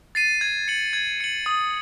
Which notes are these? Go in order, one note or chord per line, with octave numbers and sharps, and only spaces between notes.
A6 C7 D#7
G#6
C#7 F#7
G#6
C#7 F#7
D#6